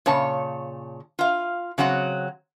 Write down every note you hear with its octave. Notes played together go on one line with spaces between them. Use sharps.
A#2 C#3 C#5 A5
F4 F5
C#3 F#3 C4 F#5